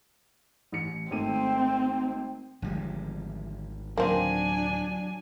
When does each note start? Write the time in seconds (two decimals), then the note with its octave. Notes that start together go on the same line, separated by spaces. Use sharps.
0.72 A1 C#7
1.11 G#1 A3 C4 D#7
2.62 G#1 D3 F3 G3 G#3
3.98 D1 D#3 F#3 A#3 C4 D4 G#5